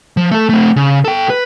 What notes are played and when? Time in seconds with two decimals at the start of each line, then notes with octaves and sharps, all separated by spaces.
0.17 F3
0.31 A3 A4
0.50 A3 C4
0.76 C#3
1.05 A4 G5
1.30 B4